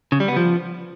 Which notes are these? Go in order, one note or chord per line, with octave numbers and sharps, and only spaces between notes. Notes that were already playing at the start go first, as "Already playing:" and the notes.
C#3
G3
B3
F3